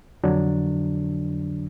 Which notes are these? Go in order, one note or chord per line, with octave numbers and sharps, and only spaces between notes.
F2 D3 F#3 D4